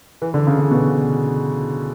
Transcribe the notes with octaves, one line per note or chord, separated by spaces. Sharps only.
E3
D3
C#3
C#3
B2